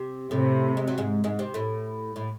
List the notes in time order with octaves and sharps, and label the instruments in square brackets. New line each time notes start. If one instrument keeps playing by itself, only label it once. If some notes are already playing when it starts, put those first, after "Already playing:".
Already playing: [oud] C3 C4
[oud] A2 A3 [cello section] C3
[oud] G#3
F#3
G#2 G#3
G#2 G#3
C3 C4
A2 A3
A2 A3